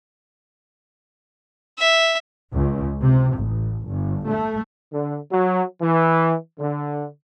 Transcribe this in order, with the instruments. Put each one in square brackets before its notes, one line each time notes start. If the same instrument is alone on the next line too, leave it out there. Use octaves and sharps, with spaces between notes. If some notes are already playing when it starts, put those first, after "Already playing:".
[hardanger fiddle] E5
[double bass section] C#2
C3
A1
G1
A3
[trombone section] D3
F#3
E3
D3